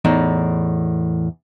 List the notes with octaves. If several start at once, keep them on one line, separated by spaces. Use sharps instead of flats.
E2 A2 D#4